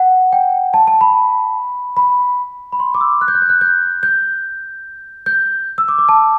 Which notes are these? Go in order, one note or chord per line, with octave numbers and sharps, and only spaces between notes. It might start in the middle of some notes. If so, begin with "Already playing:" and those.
Already playing: F#5
G5
A5
A5
B5
B5
B5
C6
D6
E6
F#6
G6
F#6
G6
F#6
G6
G6
G6
E6
D6
D6
A5